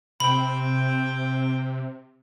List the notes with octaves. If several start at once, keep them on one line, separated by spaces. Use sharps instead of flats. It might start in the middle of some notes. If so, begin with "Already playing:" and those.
C3 C4 G5 B5